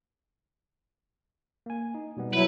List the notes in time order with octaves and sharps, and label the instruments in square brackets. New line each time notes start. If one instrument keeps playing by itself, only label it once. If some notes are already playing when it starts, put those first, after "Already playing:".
[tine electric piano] A#3 G#5
D#4
B2 G3 B3
[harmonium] F#3 E4 [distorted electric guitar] B4